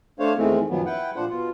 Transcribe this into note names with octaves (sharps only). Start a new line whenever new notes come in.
A3 D4 C5 C#5 F5
E2 D#3 E3 G#3 A3 C4
F#2 A#2 D#3 F3 F#3 B3
E4 B4 F#5 G5
A#2 F3 D4 C5 F#5
B2 F4